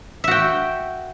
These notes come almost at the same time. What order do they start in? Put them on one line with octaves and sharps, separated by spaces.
E5 F#4 G5